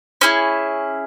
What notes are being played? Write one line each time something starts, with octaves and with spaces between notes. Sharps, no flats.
C#4 E4 G#4